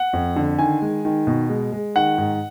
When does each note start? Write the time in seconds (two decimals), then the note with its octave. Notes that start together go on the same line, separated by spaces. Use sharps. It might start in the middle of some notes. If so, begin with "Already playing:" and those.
Already playing: F#5
0.13 F2
0.36 D3
0.59 D#3 G#5
0.82 G#3
1.05 D#3
1.27 B2
1.49 G#3
1.72 G#3
1.96 D#3 F#5
2.18 G#2